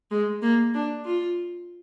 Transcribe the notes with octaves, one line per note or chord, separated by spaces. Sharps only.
G#3
A#3
D4
F4